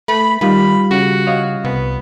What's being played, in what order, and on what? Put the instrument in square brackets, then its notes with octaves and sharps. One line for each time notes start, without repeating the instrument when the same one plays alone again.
[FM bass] A3 [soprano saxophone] B5
[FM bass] D#3 [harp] G3 F4 [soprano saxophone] B5
[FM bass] C#3 [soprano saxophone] F#4
[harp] C#5 D#5 F5
[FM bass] C2 [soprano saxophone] B3